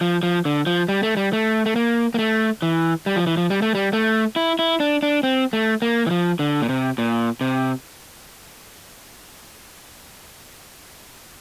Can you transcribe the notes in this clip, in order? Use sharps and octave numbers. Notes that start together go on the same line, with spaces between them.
F3
F3
D3
F3
G3
A3
G3
A3
A3
A#3
A#3
A3
E3
G3
F3
E3
F3
G3
A3
G3
A3
E4
E4
D4
D4
C4
A3
A#3
E3
F3
D3
A#2
C3
A#2
C3